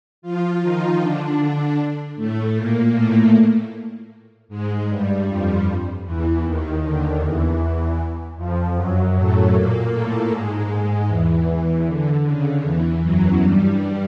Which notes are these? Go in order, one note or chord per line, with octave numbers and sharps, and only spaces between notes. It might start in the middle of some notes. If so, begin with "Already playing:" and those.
F3 F4
D#3 D#4
D3 D4
A2 A3
A#2 A#3
A2 A3
G#2 G#3
G2 G3
F2 F3
E2 E3
D#2 D#3
D3
E2 E3
F2 F3
F#2 F#3
A2 A3
A#2 A#3
A2 A3
G#2 G#3
E2 E3
E2 E3
D3
C#3
E2 E3
F#2 F#3
G2 G3